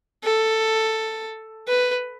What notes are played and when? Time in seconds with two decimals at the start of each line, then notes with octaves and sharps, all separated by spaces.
0.23 A4
1.67 B4